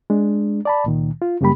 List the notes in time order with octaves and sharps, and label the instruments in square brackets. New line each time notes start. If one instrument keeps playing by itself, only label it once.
[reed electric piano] G#3 D4
D5 A5 B5
C#2 A#2 D#3
F4
F#2 C#3 G3 A#3 G4 B5